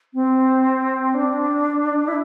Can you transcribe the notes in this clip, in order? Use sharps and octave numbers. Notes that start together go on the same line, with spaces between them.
C4
D4
E4